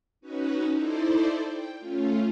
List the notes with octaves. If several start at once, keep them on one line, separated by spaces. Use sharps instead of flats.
C#4 D#4 F#4 B4
D#4 E4 A4 C5 D5
G5
A3 C#4 F4